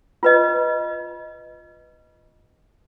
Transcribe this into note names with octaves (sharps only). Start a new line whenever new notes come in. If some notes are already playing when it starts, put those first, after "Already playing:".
F4 B4 D#5